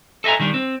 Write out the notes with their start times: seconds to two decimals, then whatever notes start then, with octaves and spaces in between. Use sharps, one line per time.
0.24 A4 D#5 E5 G#5 A#5
0.39 D#3 G3 D4
0.54 C4